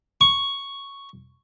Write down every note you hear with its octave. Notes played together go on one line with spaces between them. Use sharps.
C#6